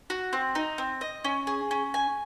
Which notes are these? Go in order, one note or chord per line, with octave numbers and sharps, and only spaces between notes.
F#4
C4
D#4
C4
D#5
C#4
G#4
C#4
G#5